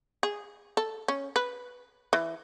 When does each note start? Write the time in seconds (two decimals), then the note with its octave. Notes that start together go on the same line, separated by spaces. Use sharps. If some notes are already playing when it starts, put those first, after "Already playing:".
0.23 G#4
0.77 A4
1.08 C#4
1.36 B4
2.13 E3